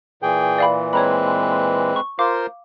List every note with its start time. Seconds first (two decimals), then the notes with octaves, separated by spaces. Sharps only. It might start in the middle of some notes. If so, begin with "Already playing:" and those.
0.22 A#2 E3 G#4 G5
0.58 D5 F5 B5
0.93 G#3 C4 B4 C#5 A#5 B5
1.96 C#6
2.19 F4 A#4 C5 F5 D6